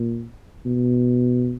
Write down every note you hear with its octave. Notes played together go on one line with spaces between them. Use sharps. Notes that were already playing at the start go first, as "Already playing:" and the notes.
Already playing: A#2
B2